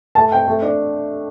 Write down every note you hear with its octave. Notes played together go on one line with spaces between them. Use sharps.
A3 A5
C4 G5
A3
D4